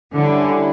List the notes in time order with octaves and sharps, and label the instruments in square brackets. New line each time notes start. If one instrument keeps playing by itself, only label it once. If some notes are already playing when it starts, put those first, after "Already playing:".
[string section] D3 [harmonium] G3 C#4 E4